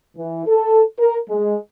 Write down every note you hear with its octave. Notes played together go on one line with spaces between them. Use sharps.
E3
A4
A#4
G#3